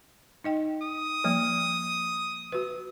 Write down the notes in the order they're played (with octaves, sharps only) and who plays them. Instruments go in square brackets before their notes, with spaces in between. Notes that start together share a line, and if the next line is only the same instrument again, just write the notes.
[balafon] D#4 D#5 G5
[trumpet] D#6
[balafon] F3 G3 A#3
F#4 B4